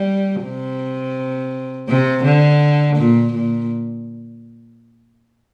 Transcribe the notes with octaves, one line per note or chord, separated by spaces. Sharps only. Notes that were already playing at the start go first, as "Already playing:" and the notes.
Already playing: G3
C3
C3
D3
A#2
A#2